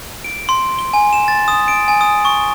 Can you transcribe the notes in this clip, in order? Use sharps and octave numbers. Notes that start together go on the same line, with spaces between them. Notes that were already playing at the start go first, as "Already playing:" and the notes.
D7
C6
G7
G#5
E7
A6
D#6
D7
G#5
D#6
C#6